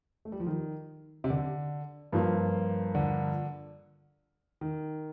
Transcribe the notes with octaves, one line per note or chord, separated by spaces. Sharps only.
A3
G3
F3
D#3
C3
D3
G2 F3 A#3 F4
D3
D#3